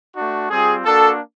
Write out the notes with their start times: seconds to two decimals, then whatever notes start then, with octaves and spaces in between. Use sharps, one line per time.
0.15 A3 D4 F#4
0.50 G3 C4 F4 G#4
0.85 A#3 D4 F#4 A4